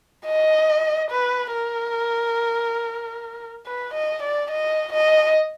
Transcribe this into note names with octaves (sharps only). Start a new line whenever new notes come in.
D#5
B4
A#4
B4
D#5
D5
D#5
D#5